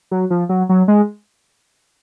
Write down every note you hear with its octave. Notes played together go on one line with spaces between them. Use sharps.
F#3
F3
F#3
F#3
G#3